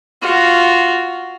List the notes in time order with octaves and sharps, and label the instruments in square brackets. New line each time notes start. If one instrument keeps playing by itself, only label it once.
[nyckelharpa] F4 F#4